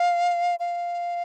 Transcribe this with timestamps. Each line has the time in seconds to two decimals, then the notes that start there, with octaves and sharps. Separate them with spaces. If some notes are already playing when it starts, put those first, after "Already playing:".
Already playing: F5
0.60 F5